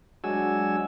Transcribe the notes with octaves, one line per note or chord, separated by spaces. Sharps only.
F#3 G#3 D4 F#4 G#5 E6